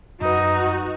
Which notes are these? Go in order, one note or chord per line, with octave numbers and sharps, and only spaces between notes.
F#2 D#4 F#4 B4